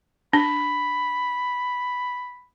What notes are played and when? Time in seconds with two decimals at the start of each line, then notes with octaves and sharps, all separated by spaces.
0.33 D4 B5